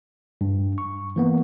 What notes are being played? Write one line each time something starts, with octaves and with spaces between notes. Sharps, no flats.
G2
C#6
E3 A#3 B3